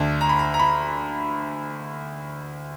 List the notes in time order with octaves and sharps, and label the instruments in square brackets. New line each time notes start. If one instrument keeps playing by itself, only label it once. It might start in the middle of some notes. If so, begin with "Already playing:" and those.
Already playing: [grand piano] D2 D3 A5
A#5
B5
A#5
A#5
B5